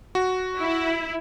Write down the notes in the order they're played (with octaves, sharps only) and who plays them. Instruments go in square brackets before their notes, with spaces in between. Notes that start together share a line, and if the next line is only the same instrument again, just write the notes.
[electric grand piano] F#4
[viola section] E4